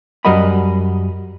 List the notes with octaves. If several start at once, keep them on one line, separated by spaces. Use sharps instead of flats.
F#2 G3 A#4 D#5 F#5 B5